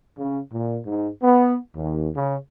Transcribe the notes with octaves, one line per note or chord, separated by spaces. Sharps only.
C#3
A#2
G#2
B3
D#2
C#3